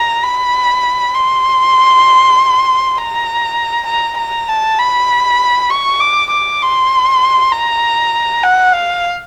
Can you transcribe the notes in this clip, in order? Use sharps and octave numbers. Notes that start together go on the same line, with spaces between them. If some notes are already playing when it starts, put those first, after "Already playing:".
Already playing: A#5
B5
C6
A#5
A#5
A#5
A5
B5
C#6
D6
D6
C6
A#5
F#5
F5